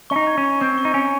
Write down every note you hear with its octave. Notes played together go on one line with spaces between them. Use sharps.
C#4 C#6
D#4
G#6
C#4
C#6
C4 C#6
C#6
D#4
C#4 G#5